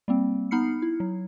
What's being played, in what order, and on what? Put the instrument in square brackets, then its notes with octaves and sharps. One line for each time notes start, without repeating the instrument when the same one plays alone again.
[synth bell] G3 A#3 C4
B3 D#4 B5 F6 C7 C#7
E4
F#3